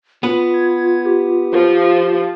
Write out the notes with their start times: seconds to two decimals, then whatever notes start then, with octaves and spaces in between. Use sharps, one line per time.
0.23 B3 F4 B4
0.54 G#6
1.05 G4
1.53 F3